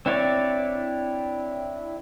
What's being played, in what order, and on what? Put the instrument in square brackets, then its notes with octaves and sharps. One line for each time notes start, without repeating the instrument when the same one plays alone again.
[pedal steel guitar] C4 D4 E4 C#5 D5